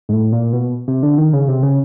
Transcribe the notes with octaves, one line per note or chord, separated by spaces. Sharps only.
G#2
A2
A#2
B2
C3
D3
D#3
C#3
C3
C#3